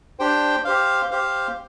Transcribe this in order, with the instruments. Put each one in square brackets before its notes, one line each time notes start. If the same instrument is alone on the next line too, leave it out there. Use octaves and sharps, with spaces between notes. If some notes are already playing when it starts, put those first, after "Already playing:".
[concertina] D4 G4 C5 G5
G4 C5 F5
G4 C5 F5